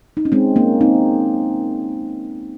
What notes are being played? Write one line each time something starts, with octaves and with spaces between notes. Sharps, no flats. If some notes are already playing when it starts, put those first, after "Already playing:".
D#4
C#4
G#3 C4
A#3 C#4
C4 D#4